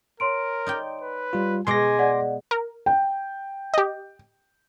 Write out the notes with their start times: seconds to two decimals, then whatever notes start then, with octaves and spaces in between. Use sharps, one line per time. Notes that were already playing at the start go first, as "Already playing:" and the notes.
0.20 A#4 C#5 C6 D7
0.67 D#4 D5 G5
1.02 B4
1.33 G3 F4
1.67 B2 G#3 G#5 C6 D6 A#6
1.99 D5 D#5 F#5
2.51 A#4
2.86 G5
3.74 G4 D#5